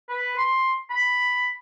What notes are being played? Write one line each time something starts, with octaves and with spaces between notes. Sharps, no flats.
B4
C6
B5